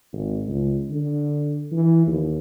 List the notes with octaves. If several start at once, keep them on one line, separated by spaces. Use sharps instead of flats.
G#1
C#2
D3
E3
D#2